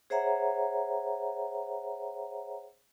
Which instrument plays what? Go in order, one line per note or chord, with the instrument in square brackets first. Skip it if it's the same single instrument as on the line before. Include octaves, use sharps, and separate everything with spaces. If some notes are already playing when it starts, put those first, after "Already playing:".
[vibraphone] G#4 C5 C#5 E5 F#5 A#5